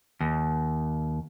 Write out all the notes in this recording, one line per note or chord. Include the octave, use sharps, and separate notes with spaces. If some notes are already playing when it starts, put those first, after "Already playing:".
D#2